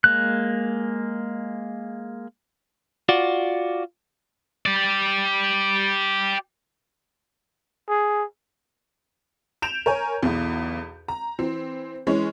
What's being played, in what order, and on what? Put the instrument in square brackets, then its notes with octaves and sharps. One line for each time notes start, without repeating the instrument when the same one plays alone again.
[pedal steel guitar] G#3 A#3 F#6
[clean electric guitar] F4 F#4 D5
[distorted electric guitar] G4 D5
[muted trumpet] G#4
[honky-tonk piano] G6 D7 E7 F7
A#4 C#5 G#5
B1 E2
A#5
E3 C4
E3 G#3 C#4